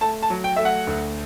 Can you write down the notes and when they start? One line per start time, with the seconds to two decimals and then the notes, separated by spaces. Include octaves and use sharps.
0.01 A3 A5
0.22 A5
0.30 F#3
0.44 G5
0.56 A3 E5
0.65 F#5
0.87 D2